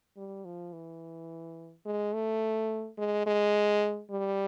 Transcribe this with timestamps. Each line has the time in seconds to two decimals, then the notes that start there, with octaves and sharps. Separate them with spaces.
0.17 G3
0.45 F3
0.73 E3
1.85 G#3
2.13 A3
2.98 G#3
3.26 G#3
4.10 G3